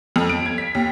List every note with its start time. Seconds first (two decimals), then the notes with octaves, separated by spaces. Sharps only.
0.16 F2
0.29 D7
0.46 G#6
0.58 B6
0.75 D#2